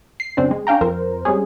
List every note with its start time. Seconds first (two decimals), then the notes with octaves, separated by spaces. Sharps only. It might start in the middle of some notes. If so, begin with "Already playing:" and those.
0.20 C7
0.37 F#2 C#3 C4 D4
0.51 G#3
0.67 C#4 D4 F5 G5 A#5
0.81 F2 A#4 C5
1.25 G3 G#3 C4 C#4 G#4